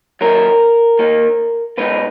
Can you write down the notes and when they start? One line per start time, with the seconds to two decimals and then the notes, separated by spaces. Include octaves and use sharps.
0.21 D#3 F#3 A#3 A#4
0.99 D#3 A#3 D#4
1.78 B2 G#3 D#4 B4